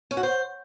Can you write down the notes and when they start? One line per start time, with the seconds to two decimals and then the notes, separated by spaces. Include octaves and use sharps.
0.11 C#4
0.17 F#4
0.23 C5